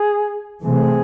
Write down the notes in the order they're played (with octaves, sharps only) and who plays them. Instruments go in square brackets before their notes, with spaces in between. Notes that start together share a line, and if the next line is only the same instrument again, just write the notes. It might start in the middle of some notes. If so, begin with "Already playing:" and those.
Already playing: [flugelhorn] G#4
[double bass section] C3 E3 A3 C4 [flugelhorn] G#4